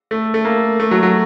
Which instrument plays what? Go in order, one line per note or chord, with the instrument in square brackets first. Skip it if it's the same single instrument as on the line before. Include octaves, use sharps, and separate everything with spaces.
[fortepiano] A3
A3
A#3
A3
F#3
F#3